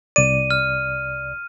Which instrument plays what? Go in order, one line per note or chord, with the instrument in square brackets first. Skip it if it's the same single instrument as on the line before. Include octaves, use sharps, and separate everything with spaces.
[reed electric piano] C2 D5 [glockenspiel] D#7
[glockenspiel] F6